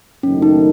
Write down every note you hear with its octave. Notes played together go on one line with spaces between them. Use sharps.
F#1 F#2 D#3 A3 C#4
D#4